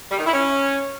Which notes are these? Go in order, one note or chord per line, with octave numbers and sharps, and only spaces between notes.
G3
D#3
E4
C#4